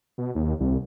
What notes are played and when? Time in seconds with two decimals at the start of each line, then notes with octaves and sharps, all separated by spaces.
0.18 B2
0.35 D#2
0.60 C2